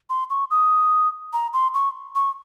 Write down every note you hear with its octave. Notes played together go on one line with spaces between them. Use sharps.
C6
C#6
D#6
A#5
C6
C#6
C#6